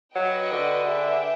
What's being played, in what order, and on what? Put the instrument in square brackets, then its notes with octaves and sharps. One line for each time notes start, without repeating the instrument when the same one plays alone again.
[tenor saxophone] F#3 [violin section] F#4 B4 D#5 G5
[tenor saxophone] D3
[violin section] G#4 B4 E5 G5